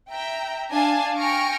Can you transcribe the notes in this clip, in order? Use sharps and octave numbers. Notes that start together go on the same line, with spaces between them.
E5 G5 A#5
D4 F5 G#5 A5
G5 G#5 C#6 F6 A#6 D7